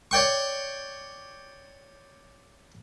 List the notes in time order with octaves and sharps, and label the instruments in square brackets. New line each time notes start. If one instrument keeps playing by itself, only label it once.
[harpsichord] C#5 D5 G5 C#6